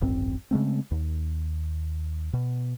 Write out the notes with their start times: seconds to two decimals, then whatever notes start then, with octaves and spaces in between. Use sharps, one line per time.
0.01 D1 G#1 F#2 C4
0.51 C#3 G#3 A3 C4
0.91 D#2
2.33 B2